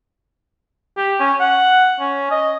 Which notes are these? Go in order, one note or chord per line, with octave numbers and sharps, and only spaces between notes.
G4
C#4
F#5
C#4
D#5